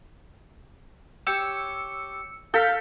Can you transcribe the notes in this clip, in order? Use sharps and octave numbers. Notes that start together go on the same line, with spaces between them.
G4 C#5 E6 C#7
A4 F5 G6 B6